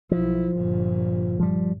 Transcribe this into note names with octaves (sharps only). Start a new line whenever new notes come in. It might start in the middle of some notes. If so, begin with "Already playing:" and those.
B1 F3 E4
G1 A#2
F3 G3